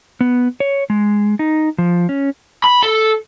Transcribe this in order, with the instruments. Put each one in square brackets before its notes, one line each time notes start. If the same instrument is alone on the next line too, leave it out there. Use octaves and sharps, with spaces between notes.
[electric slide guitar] B3
C#5
G#3
D#4
F3
C#4
[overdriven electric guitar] B5
A4